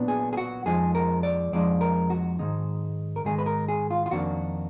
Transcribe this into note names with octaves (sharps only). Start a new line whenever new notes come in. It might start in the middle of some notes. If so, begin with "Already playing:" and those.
Already playing: A#2 F#3 B3 D4
G#4
G#4
F#4
F2 F3 G#3 D#4 G#4
A#4
D5
F2 F3 G#3 D#4 D5
A#4
F#4
G#2 D#3 G#3 D#4
A#4
G#2 D#3 G#3 D#4 G#4
B4
A#4
G#4
F4
F4
F2 D#3 A#3 D4 F#4